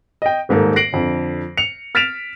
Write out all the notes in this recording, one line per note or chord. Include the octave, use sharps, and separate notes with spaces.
D#5 G5
D#1 G#2 A#3 A4
A#6 C7 D7 F#7
F2 D3
C#7 F7
F6 A6 B6 D7 E7 F7